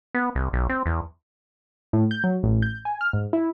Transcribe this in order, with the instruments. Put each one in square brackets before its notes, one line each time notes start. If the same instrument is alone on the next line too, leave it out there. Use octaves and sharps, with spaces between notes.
[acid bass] B3
C2
B1
C4
E2
[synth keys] A2
G6
F#3
A1
G6
G#5
F6
G#2
E4